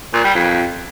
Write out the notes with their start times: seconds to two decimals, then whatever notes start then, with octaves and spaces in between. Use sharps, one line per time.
0.13 A#2
0.24 G3
0.35 F2